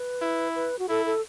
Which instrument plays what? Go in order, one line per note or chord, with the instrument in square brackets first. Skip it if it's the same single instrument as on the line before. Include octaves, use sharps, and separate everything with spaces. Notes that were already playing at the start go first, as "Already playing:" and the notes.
Already playing: [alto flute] B4
[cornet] E4
[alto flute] B4
F#4
[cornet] E4 [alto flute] A4
[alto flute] A4